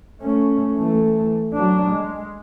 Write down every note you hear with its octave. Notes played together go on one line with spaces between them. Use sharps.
A3 C#4
E3 A3
F#3 D4
G#3